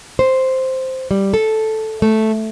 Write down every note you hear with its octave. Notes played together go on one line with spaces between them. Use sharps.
C5
G3
A4
A3